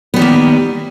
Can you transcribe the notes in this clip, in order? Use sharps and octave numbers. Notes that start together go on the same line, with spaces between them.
D#3 G3 A#3 B3